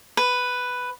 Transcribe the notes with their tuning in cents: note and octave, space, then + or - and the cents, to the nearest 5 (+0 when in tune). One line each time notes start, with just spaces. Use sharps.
B4 +5